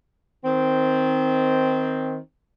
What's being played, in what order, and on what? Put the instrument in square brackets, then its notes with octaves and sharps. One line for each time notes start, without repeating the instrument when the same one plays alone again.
[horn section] D#3 C4